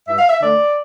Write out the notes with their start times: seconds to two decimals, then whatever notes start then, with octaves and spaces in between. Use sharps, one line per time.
0.08 G2 E5
0.19 F5
0.29 E5
0.41 D3 A3 D5